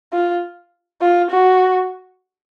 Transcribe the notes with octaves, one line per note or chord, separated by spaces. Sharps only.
F4
F4
F#4